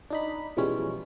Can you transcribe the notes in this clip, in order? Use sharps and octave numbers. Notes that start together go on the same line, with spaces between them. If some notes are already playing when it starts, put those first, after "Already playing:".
D4 D#4 B5
B2 E3 F3 G3 G#3 C#4